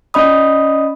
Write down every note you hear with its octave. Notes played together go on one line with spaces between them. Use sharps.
C#4 D5 D#5 B5 D#6